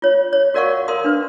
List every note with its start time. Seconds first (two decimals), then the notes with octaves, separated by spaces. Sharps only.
0.02 F4 C#5
0.33 C#5
0.54 F#4 A#4 D5 F5 F#5 C#6
0.88 A#4 F5 C6 D#6
1.04 D4 B4